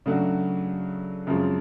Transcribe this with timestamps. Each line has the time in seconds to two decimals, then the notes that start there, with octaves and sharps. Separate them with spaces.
0.06 C#3 F#3 A3 D4 F#4
1.27 F#2 C#3 F3 G#3 C4